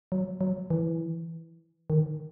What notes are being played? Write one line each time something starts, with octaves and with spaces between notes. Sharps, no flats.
F#3
F#3
E3
D#3